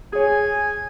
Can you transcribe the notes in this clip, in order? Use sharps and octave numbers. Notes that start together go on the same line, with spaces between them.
G#4 C#5 G#5